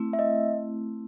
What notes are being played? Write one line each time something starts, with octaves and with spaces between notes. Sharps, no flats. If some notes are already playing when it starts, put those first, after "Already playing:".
Already playing: A3 C4 E4
E5
D#5